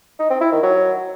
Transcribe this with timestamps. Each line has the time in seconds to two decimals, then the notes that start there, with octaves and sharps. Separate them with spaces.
0.19 D#4
0.30 C4
0.41 E4
0.52 D#3
0.63 F#3